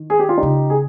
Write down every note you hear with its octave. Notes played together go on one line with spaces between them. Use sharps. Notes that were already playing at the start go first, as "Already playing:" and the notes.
Already playing: D#3
G#4
G4
F4
D#4 G4
C#3
G#4